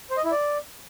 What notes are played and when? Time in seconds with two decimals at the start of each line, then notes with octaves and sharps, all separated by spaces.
0.10 C5
0.17 D#5
0.24 E4
0.31 D5